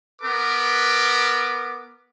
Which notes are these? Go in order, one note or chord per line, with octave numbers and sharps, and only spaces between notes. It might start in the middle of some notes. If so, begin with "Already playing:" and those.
B3 A#4 B4 D6